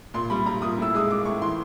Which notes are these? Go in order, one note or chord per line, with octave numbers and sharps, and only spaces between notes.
A#2 C6
G3 B5
G3 A#5
A#2 D#6
A2 E6
G#3 D#6
G#3 D6
A2 C#6
E3 C6